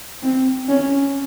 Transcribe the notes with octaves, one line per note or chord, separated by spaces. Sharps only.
C4
C#4